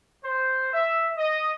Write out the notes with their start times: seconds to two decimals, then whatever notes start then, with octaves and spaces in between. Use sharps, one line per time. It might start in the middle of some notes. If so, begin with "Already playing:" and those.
0.23 C5
0.73 E5
1.17 D#5